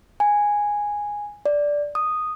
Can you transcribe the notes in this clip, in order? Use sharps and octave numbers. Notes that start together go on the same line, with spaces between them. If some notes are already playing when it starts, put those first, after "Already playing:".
G#5
D5
D#6